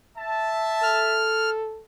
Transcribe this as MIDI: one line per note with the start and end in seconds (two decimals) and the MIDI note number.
0.18 1.27 76
0.18 1.27 81
0.83 1.82 69
0.83 1.50 89